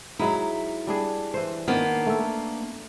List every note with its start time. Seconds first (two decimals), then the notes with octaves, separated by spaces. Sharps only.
0.19 F#3 G#3 D#4 E4
0.87 G3 D4 G#4
1.34 E3 C5
1.68 D#3 A#3 B3 D4
2.06 A3 A4